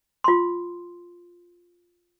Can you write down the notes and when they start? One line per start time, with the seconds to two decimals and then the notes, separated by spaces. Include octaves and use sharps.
0.24 F4 C6